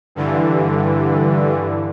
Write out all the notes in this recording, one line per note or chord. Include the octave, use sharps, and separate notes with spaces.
G2 D3 E3